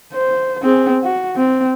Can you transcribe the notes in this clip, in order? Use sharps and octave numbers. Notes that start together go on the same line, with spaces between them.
C5
C4 G#4
F#4
C4